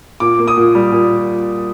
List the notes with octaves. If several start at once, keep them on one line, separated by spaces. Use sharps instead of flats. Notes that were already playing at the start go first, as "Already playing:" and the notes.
A#2 D6
A#3
D#6
A#2
G3
A#2